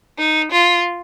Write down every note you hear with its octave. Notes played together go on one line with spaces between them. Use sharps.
D#4
F4